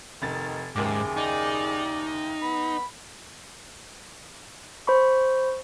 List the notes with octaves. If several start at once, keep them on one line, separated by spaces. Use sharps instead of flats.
F1 D#3 A6
F#1 D#2 G#2 G#4 D6
D#4 D5
B3 B5
C5 B5 C#6